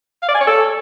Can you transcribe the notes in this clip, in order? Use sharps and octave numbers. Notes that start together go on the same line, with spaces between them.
F5
D5
G#5
C#5
A4